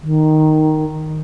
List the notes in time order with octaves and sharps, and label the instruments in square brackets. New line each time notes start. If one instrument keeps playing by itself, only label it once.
[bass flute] D#3